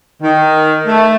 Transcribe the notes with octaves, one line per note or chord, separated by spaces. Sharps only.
D#3
A3